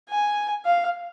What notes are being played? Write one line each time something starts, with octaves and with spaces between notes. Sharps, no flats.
G#5
F5